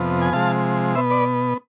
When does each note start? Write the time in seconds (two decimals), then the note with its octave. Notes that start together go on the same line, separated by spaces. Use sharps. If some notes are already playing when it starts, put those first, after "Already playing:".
Already playing: F2 C3 F3 B3
0.22 G#5
0.33 C3 F3 G#3 F5 A5
0.95 B2 B3 C5 E5
1.10 B4 D5